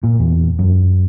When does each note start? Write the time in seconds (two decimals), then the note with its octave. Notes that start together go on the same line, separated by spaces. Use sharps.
0.03 A#2
0.19 E2
0.59 F#2